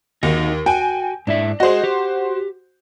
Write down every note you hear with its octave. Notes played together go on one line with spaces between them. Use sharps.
D#2 D#4 F#4
F#4 G5 G#5
G#2 D4 E4 E5
F#4 G#4 C5 D#5
G4